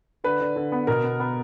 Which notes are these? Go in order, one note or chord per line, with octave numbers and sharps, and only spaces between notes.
D3 B4
D3
D3
B3
B2 A#4
B3
B3